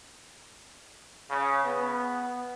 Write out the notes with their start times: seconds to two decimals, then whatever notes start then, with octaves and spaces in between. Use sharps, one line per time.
1.30 C#3
1.66 B3